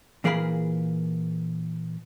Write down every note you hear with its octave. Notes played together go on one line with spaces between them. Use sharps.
A#2 E3 G#4 A#4 F5 B5